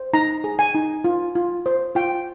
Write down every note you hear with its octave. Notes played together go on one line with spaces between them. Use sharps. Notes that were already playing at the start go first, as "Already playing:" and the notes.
Already playing: C5
D#4 A#5
G#4
G#5
D#4
F4
F4
C5
F4 G5